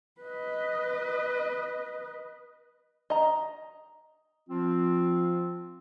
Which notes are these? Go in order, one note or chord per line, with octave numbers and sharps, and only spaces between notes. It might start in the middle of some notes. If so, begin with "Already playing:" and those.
B4 D#5
D#5 A#5
F3 C4 F4